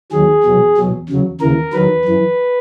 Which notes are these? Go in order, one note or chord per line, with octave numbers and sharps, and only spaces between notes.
D#2 D#3 F#3 G#4
E2 B2 F#3
E2 B2 F#3
E2 C#3 F#3
D#2 C#3 E3 A#4
E2 D#3 F#3 B4
F#2 E3